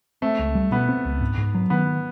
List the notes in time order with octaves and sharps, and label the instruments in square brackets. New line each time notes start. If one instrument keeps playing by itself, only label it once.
[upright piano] A3 [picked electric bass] C4
[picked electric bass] C#2
G3
[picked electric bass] B2 [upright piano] B3
[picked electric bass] C4
C#2
G#2
G#2
F#3
[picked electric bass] D#3 [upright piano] B3